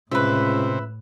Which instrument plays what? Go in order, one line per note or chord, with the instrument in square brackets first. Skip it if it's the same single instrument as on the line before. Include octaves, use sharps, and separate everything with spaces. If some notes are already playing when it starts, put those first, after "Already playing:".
[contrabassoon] C#2 [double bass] A2 [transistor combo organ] C3 [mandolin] B4 E5